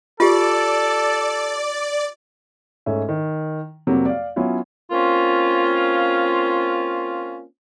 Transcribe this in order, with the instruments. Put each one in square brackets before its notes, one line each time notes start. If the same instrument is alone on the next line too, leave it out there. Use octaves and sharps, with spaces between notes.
[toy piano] F4 G4 [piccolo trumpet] A4 [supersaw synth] D5
[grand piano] G#2 A3 C#4 E5
D#3
F2 C3 F#3 G3 A#3
D5 F5
F#3 B3 C#4 E4 F4
[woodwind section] A#3 C4 C#4 F4